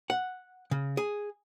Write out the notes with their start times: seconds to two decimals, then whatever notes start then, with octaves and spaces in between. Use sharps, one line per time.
0.10 F#5
0.71 C#3
0.97 G#4